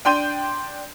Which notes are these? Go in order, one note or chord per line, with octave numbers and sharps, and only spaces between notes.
D4 G5 C6 G6 D#7